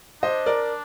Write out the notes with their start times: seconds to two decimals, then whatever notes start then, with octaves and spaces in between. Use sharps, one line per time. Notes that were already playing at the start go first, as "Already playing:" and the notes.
0.23 D4 C5 D#5
0.46 A#4 D5